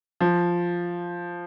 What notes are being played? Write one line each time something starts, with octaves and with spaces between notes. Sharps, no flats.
F3